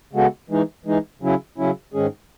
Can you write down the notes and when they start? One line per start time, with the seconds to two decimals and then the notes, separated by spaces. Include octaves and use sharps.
0.13 C#3 G#3 B3 F#4 A4
0.50 E3 G#3 D#4
0.85 E3 G#3 D#4
1.22 C#3 F#3 C#4 E4
1.58 C#3 F#3 C#4 E4
1.94 G#2 D#3 G#3 C#4 G#4